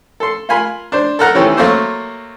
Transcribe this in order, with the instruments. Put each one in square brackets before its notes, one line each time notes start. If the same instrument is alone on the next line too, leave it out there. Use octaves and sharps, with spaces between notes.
[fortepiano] A4 C6
F4 A#4 G#5 B5 C6
D4 C5
A4 A#4 F#5 A#5
C3 D#3 E3 C4 C#4 A4
F#3 A3 A#3 C5